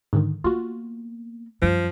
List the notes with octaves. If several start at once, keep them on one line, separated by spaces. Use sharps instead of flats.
G#2 D3 D#3
A#3 B3 F4 F#4
F#2 F3 G3